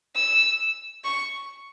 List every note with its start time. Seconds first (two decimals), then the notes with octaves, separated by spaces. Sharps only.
0.16 E6
1.04 C#6